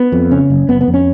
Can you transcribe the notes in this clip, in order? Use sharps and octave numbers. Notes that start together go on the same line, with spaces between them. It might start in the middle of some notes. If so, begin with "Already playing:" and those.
Already playing: B3
F2
C#3 C#4
F#1
F#1 B3
B3
F2
C#4